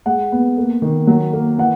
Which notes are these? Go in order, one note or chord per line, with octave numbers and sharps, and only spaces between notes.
G#3 F#5
B3
A#3
D#3
F#3
A#3
E3 F#5